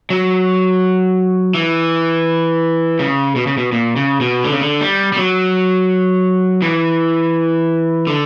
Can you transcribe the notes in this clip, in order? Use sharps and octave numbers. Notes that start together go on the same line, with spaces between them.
F#3
E3
C#3
B2
C#3
B2
A#2
C#3
B2
D3
C#3
D3
G3
G3
F#3
E3
D3